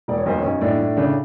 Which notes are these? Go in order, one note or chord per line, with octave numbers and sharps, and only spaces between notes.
E1 D5
C#5
B1 C5
C#4 C#5
B1
A2 D4 D5
A2
C#3 D4 D5